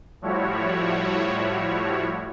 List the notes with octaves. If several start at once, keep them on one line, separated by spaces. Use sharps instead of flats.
A2 F3 G3 E4 F#4 C#5